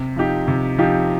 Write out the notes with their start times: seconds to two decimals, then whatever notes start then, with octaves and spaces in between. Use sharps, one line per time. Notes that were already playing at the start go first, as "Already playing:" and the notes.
Already playing: C3
0.16 F3 D#4 G4
0.48 C3
0.78 F3 D#4 G4